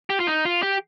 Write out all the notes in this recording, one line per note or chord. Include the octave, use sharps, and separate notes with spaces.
G4
F4
D#4
F4
G4